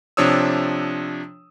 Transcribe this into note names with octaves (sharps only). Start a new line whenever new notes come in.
C3 F3 D4 C#5 D#6 E6